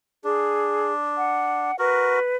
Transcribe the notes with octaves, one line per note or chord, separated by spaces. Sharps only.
D4 G#4
F#5
F#4 A#4 B4